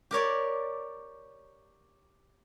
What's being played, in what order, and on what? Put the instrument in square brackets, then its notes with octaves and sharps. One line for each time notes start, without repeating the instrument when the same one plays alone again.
[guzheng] G4 A#4 C#5 D5